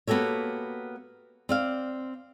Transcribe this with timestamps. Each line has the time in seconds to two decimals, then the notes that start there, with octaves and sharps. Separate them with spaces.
0.07 A#3 B3 F#4 G4 A4 C#5
1.49 C4 D5 F5